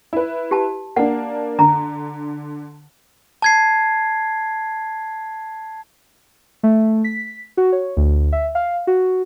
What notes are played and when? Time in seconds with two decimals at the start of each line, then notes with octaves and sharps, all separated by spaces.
0.13 E4 B4
0.51 G4 A5
0.96 A#3 D4 F#5
1.59 D3 A#5
3.42 A5 G#6 C7
6.63 A3
7.04 B6
7.57 F#4
7.72 C#5
7.97 D2
8.32 E5
8.55 F5
8.87 F#4